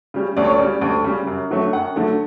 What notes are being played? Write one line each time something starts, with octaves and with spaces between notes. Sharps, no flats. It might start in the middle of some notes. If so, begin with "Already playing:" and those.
C#3 G3
D2 D5
C#5
D5
C#3 G3
D2
C#3 G3
F#2
D3 F#3 A3
F#2 F#5
D3 F#3 A3